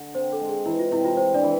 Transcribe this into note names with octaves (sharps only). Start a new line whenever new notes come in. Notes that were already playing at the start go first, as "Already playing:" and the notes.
Already playing: D3
C4 C5
A4
G#3
G#4
E3 E4
F4
C3 E4
F4
C3 C5
D4 D5
E3